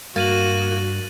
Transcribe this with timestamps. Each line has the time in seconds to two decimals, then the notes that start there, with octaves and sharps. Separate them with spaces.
0.16 G2 A#3 F#4 A6 D#7 F#7